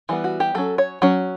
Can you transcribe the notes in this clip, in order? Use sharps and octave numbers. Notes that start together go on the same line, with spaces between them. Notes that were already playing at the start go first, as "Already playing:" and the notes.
E3 G3 B3
F#4
G4
F#3 C#4 A4
C#5
F#3 C#4